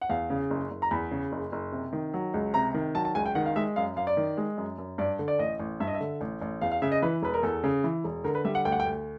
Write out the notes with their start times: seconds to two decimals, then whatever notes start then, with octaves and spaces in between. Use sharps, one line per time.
0.01 F#5
0.10 E2 F5
0.30 C#3
0.50 F#1
0.71 F#1
0.82 A#5
0.91 E2 B5
1.11 C#3
1.32 F#1
1.52 F#1
1.72 C3
1.93 D#3
2.14 F#3
2.34 C#2
2.54 C3 A#5
2.74 D#3
2.95 F#3 A5
3.05 A5
3.15 C#2 G#5
3.26 G5
3.35 D#3 F#5
3.46 F5
3.56 G#3 E5
3.76 F#2 F5
3.96 F#2 F5
4.07 D5
4.17 D#3
4.37 G#3
4.58 F#2
4.78 F#2
4.98 G2 D5
5.19 D3
5.28 D5
5.39 A1 D#5
5.60 A1
5.80 G2 E5
5.87 D#5
5.95 E5
6.01 D3
6.21 A1
6.41 A1
6.61 E2 F5
6.72 F5
6.82 C#3 E5
6.92 D#5
7.02 E3 B4
7.22 E1 B4
7.34 A#4
7.43 E2 A4
7.64 C#3
7.84 E3
8.04 E1
8.24 D3 A#4
8.35 B4
8.45 G3 E5
8.55 F#5
8.65 D2 G5
8.72 F#5
8.80 G5
8.86 D2